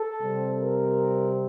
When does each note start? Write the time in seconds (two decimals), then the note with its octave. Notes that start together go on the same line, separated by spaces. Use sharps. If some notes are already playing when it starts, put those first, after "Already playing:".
Already playing: A4
0.23 C3 G3 C4
0.60 A#4